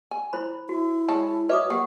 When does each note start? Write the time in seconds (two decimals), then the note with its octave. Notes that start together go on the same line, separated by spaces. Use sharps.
0.11 G#5
0.33 E4 C5 B5
0.69 E4 F#4
1.08 G#3 C#5 A5
1.49 F#4 B4 C#5 D#5 E5 D6 D#6
1.70 F#3 A#3 G4 F#5